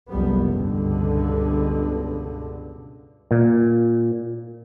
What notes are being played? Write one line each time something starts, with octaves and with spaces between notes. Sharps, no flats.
F#1 C2 F2 G3 B3
C#2 G2 B2 D3
A#2